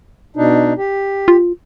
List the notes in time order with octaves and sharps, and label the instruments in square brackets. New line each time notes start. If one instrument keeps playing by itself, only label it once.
[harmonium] B2 D4 D#4
G4
[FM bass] F4